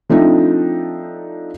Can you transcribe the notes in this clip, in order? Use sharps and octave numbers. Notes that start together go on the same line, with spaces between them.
F3 A3 C4 D4 D#4